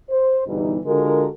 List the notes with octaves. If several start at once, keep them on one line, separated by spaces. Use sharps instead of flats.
C5
G1 E2 B2 E3 G3 D#4
D3 G#3 F4 F#4 A4 A#4